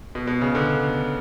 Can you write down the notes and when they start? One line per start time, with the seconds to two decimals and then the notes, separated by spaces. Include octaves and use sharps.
0.15 B2
0.27 B2
0.41 C#3
0.54 B2 D3